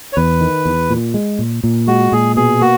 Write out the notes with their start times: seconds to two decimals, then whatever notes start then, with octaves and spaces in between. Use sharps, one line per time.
0.13 C#5
0.16 E2 B4
0.40 D#3
0.65 E2
0.90 A#2
1.14 G#3
1.39 A#2
1.64 A#2
1.87 G#3 F#4
2.12 A#2 G#4
2.36 B2 G#4
2.61 A#3 F#4